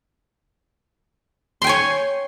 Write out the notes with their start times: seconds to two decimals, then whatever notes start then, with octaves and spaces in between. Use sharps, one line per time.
1.62 C6
1.64 G5
1.67 G#5
1.69 C#5